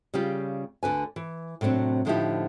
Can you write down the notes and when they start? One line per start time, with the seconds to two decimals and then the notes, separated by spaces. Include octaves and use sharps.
0.14 C#3 G3 F4 G4
0.83 D2 D3 B4 G#5
1.16 E3
1.61 A2 C3 F#3 C4 D4
2.05 A2 D3 F3 D#4 E4 G4